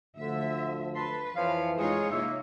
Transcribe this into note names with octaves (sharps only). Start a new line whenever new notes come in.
D2 D3 F3 A3 E5
B4 A5 C6
F2 E3 F3 C#5 F5
G#3 D#4 F4 G#4 C#5
C3 A#3 E5